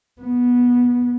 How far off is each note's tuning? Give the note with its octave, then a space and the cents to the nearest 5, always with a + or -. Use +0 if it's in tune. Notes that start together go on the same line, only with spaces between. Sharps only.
B3 -15